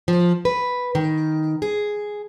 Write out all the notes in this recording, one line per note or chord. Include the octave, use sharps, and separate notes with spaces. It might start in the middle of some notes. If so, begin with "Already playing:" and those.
F3
B4
D#3
G#4